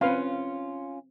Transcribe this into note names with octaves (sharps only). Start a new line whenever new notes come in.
C4 C#4 F4 B4 F5